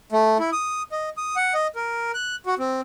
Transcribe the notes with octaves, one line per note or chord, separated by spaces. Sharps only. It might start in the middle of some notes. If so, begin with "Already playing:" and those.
A3
E4
D#6
D#5
D#6
F#5
D#5
A#4
F#6
F#4
C4